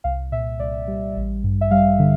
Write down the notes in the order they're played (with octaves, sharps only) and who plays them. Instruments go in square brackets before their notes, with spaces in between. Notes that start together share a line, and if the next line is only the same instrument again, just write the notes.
[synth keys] C2 F5
A#2 E5
C2 D5
G3
A1
G2
E5
G3 F5
D3